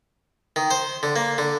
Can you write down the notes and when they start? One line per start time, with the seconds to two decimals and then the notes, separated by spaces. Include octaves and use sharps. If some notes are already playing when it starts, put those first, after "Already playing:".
0.56 D#3
0.71 C5
1.03 D3
1.16 A#3
1.38 D3